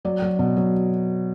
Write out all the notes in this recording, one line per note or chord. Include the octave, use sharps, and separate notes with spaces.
F#3 D5
F#3
B2
F#3